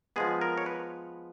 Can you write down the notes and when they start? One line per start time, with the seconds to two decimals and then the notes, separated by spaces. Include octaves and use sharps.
0.16 F3 G#3 B3 G#4
0.41 A#4
0.58 C#5
0.66 B4